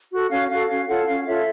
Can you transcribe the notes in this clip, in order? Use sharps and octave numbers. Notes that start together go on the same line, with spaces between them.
F#4 A4
C#4 F5
F#4 A4 F5
C#4 F5
F4 A4 C#5 F#5
C#4 F5
F4 A4 C#5 E5